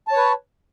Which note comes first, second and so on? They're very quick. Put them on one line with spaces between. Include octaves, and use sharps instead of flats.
A5 C#5 B4